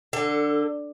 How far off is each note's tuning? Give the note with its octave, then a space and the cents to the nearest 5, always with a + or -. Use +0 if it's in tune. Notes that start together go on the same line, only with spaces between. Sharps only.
D3 +5 A4 +30